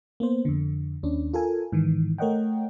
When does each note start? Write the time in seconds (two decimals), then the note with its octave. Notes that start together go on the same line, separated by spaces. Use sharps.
0.20 A#3 B3 C5
0.45 F2 D3
1.03 D#2 C#4 D4
1.33 F4 A4 A#4 G#5
1.72 G#2 D#3 E3
2.18 A3 A#4 C#5 D#5 F#5 G5